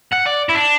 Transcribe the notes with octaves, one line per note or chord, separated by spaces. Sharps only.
F#5
D5
E4
D4